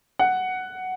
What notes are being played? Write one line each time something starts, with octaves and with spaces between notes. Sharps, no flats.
F#5